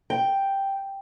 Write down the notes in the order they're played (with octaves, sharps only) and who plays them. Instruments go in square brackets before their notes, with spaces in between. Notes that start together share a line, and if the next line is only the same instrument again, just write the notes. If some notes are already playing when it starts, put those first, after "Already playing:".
[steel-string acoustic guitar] G5